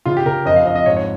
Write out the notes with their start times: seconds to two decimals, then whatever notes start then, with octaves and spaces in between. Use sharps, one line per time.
0.06 C#3 F4
0.17 G4
0.25 C#3 A#4
0.45 F2 D#5
0.56 F5
0.65 F2 D#5
0.76 D#5
0.86 G#2 C#5
0.97 C#5